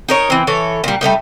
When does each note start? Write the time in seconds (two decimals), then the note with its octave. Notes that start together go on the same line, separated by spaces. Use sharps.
0.09 D#4 A#4 C#5
0.30 E3 C4
0.47 E3 A4 C#5
0.84 A#2 G3
1.01 G3 A3 A#3 D#4